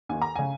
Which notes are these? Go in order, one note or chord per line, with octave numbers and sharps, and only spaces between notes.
D#2 D#3 G#5
A#5
C#3 G#5